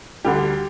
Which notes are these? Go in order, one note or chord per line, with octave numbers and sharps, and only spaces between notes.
D2 D3 G3 G4